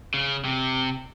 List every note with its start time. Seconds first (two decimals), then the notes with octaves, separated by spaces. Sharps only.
0.14 C#3
0.45 C3